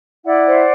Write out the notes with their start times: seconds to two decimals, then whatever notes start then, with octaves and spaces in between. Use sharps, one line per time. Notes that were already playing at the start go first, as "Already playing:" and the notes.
0.25 E4 D5 F#5
0.46 C5